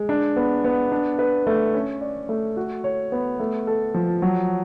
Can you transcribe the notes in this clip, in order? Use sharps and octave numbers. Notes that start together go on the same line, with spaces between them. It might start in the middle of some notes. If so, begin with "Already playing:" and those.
Already playing: G#3
D4
B3
B3
D4
B4
A3
C#4
D5
A3
F#4
C#5
B3
A3
A4
F3
F#3